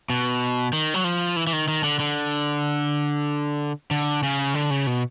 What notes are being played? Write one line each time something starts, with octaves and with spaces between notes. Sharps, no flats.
B2
D#3
F#3
F3
E3
E3
D#3
D#3
D3
D3
D3
C#3
D3
C#3
B2